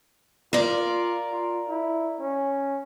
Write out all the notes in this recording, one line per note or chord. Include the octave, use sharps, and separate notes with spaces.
F4 A#4 D5
F4
E4
C#4